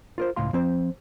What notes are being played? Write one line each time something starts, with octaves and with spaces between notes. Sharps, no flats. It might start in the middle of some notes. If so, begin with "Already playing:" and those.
F4 A#4 C5
C#2 A2 F5 C6
F3 C4 C5